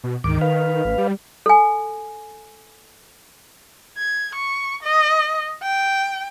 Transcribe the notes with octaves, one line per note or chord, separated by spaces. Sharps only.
B2
D2 G#2 D#3 D6
B4 F5
A1
G3
A4 G#5
G#6
C#6
D#5
G5